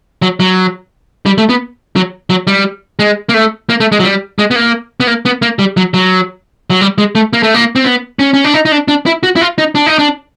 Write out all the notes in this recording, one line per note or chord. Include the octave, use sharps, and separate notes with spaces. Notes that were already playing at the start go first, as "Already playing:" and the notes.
F#3
F#3
G3
A3
B3
F#3
F#3
G3
G#3
A#3
A3
A#3
A3
G#3
F#3
G3
G#3
B3
A#3
B3
A#3
B3
A#3
G3
F#3
F#3
F#3
G3
G#3
A3
A#3
A3
A#3
C4
B3
C#4
C#4
D4
D#4
D#4
D4
D4
E4
F#4
E4
F4
D#4
D4
D#4
D4